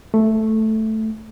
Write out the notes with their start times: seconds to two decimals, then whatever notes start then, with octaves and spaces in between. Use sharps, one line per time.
0.14 A3